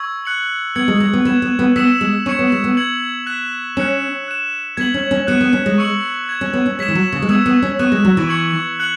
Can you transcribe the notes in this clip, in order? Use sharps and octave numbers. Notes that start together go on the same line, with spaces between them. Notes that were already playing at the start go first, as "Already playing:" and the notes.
Already playing: C#6 E6 G#6
F#6 C#7 F#7
B3 G#6 C#7 F#7
G#3
G#3
B3
B3 G#6 E7
B3
B3
B3 E6 B6 E7
G#3
C#4 C#6 G#6 C#7 E7
B3
G#3
B3
G#6 C#7 F#7
F#6 B6 E7
C#4 F#6 C#7 E7
F#6 E7
B3 G#6 B6 F#7
C#4
C#4
B3 F#6 C#7 E7
B3
C#4
G#3
C#6 E6 C#7 F#7
G#6 E7
C#4
B3
C#4
G#3 G#6 B6 E7
E3
F#3
C#3
G#3
B3 E6 G#6 E7
B3
C#4
B3 C#6 F#6 E7
G#3
F#3
E3
C#6 G#6 C#7 F#7
F#6 C#7 F#7